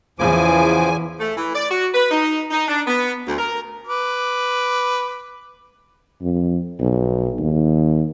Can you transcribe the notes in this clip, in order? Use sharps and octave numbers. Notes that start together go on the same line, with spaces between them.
E2 C#3 E3 F3 G#5 D6
A3
E3
D5
F#4
B4
D#4
D#4
D4
B3
D2
A#4
B4 D6
F2
B1
D#2